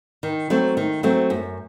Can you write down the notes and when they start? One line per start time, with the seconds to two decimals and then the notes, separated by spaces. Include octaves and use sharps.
0.23 D#3
0.50 F#3 A3 C4
0.77 D#3
1.03 F#3 A3 C4
1.30 F#2